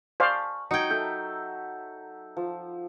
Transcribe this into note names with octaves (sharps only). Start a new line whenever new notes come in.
C5 D5 F5 G#5 A5 B5 C#6 F6
F#3 D#4 G5 G#6 C#7
A4 A#4 E5 G6
F3